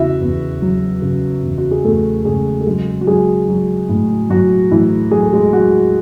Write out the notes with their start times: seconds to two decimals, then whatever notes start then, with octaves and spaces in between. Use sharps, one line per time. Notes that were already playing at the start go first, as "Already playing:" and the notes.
Already playing: E2 C#3 E4 F#4 E5
0.21 E2
0.62 F#3
1.02 C#3
1.43 E2
1.58 F#4
1.71 G#4
1.84 E2 A3 A4
2.25 C#3 G#3 G#4
2.61 A4
2.67 F#3 G#3 G#4
3.01 F#4
3.07 F#3 G#3 G#4
3.48 F#3
3.89 A2
4.30 A2 F#3 F#4
4.70 A2 E3 E4
5.11 F#3 G#4
5.23 A4
5.34 G#3 G#4
5.53 F#3 F#4 F#5